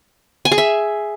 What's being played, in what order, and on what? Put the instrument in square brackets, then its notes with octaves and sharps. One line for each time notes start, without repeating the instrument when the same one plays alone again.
[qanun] G#5
G#4
E5